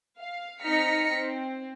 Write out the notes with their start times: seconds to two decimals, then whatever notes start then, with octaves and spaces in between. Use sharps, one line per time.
0.18 F5
0.61 C4 D#4 F6 A#6 B6 C#7
1.10 C4